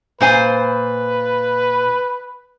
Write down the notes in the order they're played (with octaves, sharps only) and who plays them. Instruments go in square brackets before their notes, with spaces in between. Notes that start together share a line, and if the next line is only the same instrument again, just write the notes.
[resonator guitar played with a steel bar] A#2 C5 G#5 [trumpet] B4